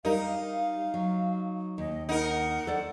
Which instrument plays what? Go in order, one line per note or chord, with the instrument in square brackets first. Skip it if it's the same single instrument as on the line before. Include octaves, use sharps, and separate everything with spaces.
[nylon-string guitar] G3 G4 A#4 [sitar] D#4 [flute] F5
[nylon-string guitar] F#3
[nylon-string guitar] D#2 [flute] D#5
[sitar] D#4 A#4 [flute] F#5
[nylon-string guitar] A4 C5 D5